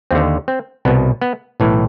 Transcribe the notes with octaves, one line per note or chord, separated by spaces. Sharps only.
D#2 D3 C4
C4
C2 B2 B3
B3
B1 A2 E3